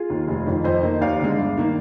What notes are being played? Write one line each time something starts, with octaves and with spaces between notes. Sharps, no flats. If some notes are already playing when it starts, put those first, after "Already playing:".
Already playing: F4 G#4
D#2 D#3
F1
F2 D#3
F2 C5 D#5
D#3 A#3
D#2 D5 F5
D3 G#3
G1
D#3 A#3